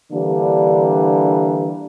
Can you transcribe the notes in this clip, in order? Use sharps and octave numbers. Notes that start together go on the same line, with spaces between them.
D3 E3 G3 A#3 D4